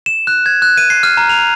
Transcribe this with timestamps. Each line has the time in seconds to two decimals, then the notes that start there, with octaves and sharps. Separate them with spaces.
0.06 E7
0.27 F#6
0.46 G#6
0.62 F#6
0.77 D#7
0.90 C7
1.03 F6
1.17 A#5
1.29 F7